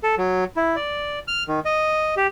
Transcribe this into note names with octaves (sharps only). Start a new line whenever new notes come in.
A4
F#3
E4
D5
F6
D#3
D#5
G4